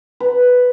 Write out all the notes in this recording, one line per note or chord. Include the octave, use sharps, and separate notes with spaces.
B4